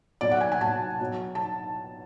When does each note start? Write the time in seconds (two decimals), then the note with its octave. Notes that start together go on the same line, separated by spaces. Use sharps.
0.21 B2 F#3 D5
0.31 F#5
0.41 G#5
0.52 G#5
0.61 B2 F#3 A5
1.00 B2 F#3
1.35 A5